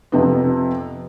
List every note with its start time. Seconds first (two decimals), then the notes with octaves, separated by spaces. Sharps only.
0.12 F2 C3 B3